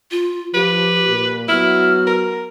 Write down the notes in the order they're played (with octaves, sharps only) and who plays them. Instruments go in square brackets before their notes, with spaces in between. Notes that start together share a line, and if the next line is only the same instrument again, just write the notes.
[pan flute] F4
[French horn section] F3 [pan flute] G4 [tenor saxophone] B4
[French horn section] A#2
[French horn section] F#3 B3 F#4 [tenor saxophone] E4 [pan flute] F6
[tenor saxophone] A#4